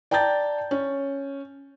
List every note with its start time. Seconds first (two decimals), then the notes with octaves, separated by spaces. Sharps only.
0.11 D5 G5 A5 A#5 G6 A6
0.71 C#4